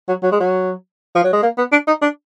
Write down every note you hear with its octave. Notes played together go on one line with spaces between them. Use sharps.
F#3
F#3
G#3
F#3
F3
F#3
G#3
A#3
B3
D4
D#4
D4